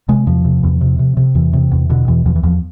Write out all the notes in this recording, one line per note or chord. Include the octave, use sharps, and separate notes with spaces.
C3 G#3
E2 F3
C3
E2
C3
C3
C3
E2 E3
C3
E2
B2 D3
E2 E3
E2 F3
E3
E2 F3